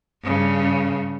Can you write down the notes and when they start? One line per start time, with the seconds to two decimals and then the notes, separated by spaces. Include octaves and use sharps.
0.23 G2 C#3